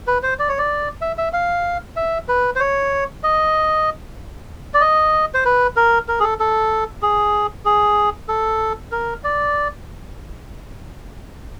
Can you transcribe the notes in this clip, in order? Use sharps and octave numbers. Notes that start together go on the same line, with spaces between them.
B4
C5
D5
C#5
D5
E5
E5
F5
E5
B4
C5
C#5
D#5
D5
D#5
C5
B4
A#4
A#4
G#4
A4
A4
G#4
G#4
A4
A#4
D5